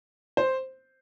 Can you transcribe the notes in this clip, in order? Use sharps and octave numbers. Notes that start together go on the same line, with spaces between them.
C5